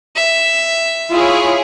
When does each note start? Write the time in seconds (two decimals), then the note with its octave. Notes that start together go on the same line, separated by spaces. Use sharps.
0.16 E5
1.10 E4 F4 G#4 C#5